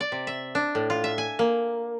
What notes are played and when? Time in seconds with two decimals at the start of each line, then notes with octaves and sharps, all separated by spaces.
0.01 D5
0.12 C3
0.27 E5
0.55 D4
0.75 A2
0.90 F4
1.04 E5
1.18 G#5
1.39 A#3